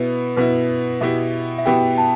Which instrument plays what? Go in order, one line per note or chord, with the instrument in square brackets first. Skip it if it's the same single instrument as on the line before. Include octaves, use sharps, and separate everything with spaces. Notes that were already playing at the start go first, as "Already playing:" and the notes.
Already playing: [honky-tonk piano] B2 B3 E4 [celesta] B4
[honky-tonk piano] B2 B3 E4 [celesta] B4
[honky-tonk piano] B2 B3 E4 G4 [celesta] E5
[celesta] E5
[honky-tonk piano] B2 B3 E4 G4 [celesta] G5
[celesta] A5